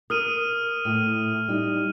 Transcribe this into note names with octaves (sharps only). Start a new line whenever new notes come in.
A#4 D#6 F6 D#7
A2
G3 D#4